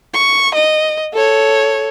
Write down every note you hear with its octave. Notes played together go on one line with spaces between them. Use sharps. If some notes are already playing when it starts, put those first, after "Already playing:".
C#6
D#5
A4 C#5